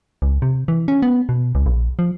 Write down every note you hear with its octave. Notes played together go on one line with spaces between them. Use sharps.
C#2
C3
E3
C#4
B3
B2
C#2
A#1
F3